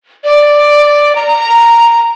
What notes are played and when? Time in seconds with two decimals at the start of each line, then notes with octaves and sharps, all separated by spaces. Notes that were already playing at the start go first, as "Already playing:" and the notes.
0.24 D5
1.15 A#5